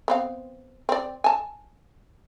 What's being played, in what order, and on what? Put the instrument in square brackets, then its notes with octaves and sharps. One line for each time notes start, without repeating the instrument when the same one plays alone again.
[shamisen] B3 C4 F5
C4 D5
G#5 A5